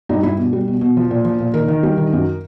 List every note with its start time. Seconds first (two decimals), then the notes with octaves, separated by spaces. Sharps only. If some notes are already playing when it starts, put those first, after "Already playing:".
0.09 G2 D#4
0.23 G2 E4
0.37 B2
0.53 G3
0.68 B2
0.81 B2
0.97 F3
1.11 A#2
1.25 F3
1.40 A#2
1.54 D#3 A#4
1.68 D#3
1.83 G3
1.98 D#3
2.13 F#2